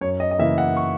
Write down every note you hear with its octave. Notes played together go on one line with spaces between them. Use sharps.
F#2 C#5
D#5
D#5
C#3 E3 A#3 E5
F#5
C#6